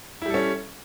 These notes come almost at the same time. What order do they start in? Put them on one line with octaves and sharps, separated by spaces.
E4 G3 A4 C#4